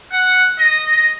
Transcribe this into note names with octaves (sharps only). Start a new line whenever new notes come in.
F#5
D#5